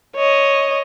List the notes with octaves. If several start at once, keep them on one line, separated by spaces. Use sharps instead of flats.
C#5 D#5